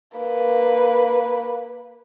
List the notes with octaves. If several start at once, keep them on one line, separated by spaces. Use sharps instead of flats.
A#3 B4